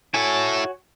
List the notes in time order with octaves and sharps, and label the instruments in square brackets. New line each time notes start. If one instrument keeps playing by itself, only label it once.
[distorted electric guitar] E4 A4 [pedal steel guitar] F#4 C#5 G#5